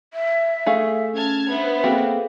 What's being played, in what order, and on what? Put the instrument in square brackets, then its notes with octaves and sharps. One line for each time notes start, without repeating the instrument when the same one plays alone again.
[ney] E5
[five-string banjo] A3 G#4 F5 [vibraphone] A4
[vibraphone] C#4 [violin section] A5 F6 G#6
[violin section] B3 C5 [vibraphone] D4 [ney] E5
[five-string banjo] A#3 C4 F#4 [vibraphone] G#4 A4 F5